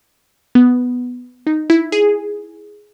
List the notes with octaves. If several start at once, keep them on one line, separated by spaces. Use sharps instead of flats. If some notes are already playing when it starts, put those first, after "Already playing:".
B3
D#4
E4
G#4